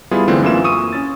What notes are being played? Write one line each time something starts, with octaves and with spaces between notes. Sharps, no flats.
G3 B3 E4 F4 G#4
D3 E3 A3 C4 E4 F4
F#2 E3 A#3 E4 F4 E7
C#6 D#6 E6 D#7
C#4 A6